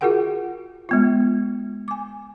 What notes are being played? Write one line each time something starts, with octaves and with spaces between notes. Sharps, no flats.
F4 F#4 G#4 A#4 F#5 G5
G#3 B3 F4
G#5 D6